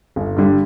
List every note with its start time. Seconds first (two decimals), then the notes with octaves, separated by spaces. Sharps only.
0.16 G1
0.36 G2 D3 G3